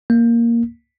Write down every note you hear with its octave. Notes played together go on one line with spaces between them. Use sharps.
A#3